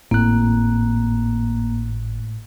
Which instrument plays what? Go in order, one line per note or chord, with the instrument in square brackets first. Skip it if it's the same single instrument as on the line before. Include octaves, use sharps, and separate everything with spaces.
[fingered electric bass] G#1 C4 [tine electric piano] A2 F#6 [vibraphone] A#3